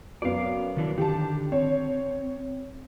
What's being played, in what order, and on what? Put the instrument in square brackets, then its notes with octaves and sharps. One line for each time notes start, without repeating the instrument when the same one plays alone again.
[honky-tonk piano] F#2 B3 [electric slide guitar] D5 F5
[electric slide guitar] D#3 E3 D4
[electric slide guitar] D3 D#3 [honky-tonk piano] G4 A5
[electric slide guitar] C4 [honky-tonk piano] C#5